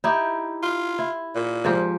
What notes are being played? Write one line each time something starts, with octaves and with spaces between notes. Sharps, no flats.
D#4 E4 G4
F4
E4
A#2
G#2 F3 G4